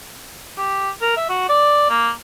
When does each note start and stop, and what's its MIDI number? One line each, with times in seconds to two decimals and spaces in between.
0.58 0.90 67
1.01 1.16 70
1.17 1.27 76
1.30 1.44 66
1.49 1.85 74
1.90 2.11 58